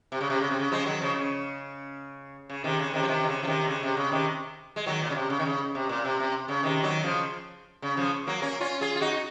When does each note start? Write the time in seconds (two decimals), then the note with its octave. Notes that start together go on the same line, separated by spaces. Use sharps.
0.12 C3
0.21 C#3
0.30 C3
0.41 C#3
0.51 C3
0.59 C#3
0.72 F3 G#3
0.86 D#3 F#3
1.00 C#3 F3
1.15 C#3
2.50 C#3
2.64 C3 D#3
2.79 C#3
2.94 C3 D#3
3.03 F3
3.08 C3 D#3
3.23 D#3
3.27 C#3
3.43 F3
3.47 C3 D#3
3.68 C#3
3.83 C3
3.97 C#3
4.12 C3 D#3
4.76 G#3
4.86 D#3 F#3
5.01 A#2
5.10 C#3
5.15 C3
5.30 C#3
5.39 D#3
5.45 C#3
5.75 C3
5.89 A#2
6.05 C3
6.20 C3
6.48 C#3
6.63 C3 D#3
6.83 D#3 F#3
7.03 C#3 F3
7.82 C#3
7.97 C#3 F3
8.27 F#3 A#3
8.42 A#3 C#4
8.61 C#4 F4
8.81 F4 G#4
8.96 F4
9.01 D#4 F#4